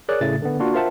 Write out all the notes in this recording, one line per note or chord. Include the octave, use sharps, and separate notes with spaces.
G#4 A#4 C#5 D5 F#6
A2 C#3 A3 A6
D3 B3
A#3 D4 F4 F#4
F4 A#4 C5 E5 F#5 A5